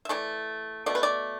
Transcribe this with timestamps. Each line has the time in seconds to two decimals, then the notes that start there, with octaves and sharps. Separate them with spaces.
0.05 E5
0.09 E3 A3 D5
0.86 B2 A3 D5
0.95 B4
1.03 D5